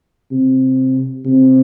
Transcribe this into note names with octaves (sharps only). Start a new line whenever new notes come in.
C3
C3